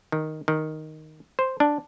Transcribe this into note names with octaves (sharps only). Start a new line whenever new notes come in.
D#3
D#3
C5
D4